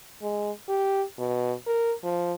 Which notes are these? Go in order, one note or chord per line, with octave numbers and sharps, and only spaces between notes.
G#3
G4
B2
A#4
F3